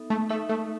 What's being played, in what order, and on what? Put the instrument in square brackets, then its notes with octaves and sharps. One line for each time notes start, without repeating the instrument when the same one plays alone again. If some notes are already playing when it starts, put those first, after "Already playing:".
Already playing: [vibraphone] B3 D#4 A4 E5
[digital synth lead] A3
[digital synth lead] A3 [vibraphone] D#4 A4 E5
[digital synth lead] A3